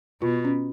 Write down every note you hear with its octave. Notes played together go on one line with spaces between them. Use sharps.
B2 F4
C#4